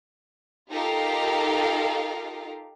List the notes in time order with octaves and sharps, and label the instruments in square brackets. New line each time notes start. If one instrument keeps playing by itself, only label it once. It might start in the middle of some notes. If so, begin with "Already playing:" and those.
[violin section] D#4 F4 G4 A4 A#4 F5